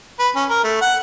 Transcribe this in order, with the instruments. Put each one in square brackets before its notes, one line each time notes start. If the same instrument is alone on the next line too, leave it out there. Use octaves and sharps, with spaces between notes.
[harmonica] B4
C#4
A#4
A3
F#5